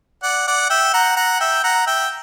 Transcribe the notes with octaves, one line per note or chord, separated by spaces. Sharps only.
D5 F#5
D5 F#5
E5 G5
F#5 A#5
F#5 A#5
E5 G5
F#5 A#5
E5 G5